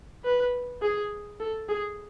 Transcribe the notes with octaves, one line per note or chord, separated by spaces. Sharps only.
B4
G#4
A4
G#4